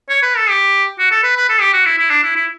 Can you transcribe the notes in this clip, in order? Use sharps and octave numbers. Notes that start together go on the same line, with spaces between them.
C#5
B4
A4
G4
F#4
A4
B4
B4
A4
G4
F#4
E4
E4
D4
E4
E4